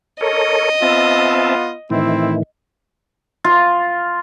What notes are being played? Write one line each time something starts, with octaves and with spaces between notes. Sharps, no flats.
A4 A#4 C#5 D#5
B3 C4 F4 E5 A5
A2 D#3 E3 C4 E4
F4